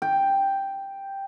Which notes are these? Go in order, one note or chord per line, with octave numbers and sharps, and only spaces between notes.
G5